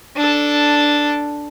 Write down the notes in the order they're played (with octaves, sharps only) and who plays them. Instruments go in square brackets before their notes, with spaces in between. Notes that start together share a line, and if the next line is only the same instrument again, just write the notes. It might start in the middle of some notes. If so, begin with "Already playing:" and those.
[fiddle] D4 A4